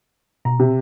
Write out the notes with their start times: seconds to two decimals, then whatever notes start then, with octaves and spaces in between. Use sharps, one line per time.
0.45 B2 A#5
0.59 C3